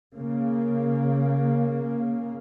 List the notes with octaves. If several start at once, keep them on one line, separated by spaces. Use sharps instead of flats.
C#3 A#3